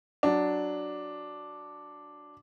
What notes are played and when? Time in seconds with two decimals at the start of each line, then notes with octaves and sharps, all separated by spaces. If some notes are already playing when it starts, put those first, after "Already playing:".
0.23 F#3 D4